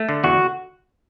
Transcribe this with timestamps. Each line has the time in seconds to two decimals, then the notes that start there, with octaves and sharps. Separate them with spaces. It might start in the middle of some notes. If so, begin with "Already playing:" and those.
Already playing: A3
0.09 D3
0.24 E2 F#4